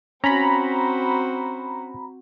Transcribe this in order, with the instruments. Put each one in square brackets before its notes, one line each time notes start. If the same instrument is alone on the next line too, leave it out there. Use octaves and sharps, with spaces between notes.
[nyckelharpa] C4 F#4 [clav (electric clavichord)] C#4 [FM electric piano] A#5 B5